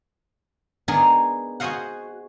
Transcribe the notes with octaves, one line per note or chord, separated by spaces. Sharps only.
B3 D4 D#4 G#4 A#4
F#4 G#4 C5 D#5 F5 F#5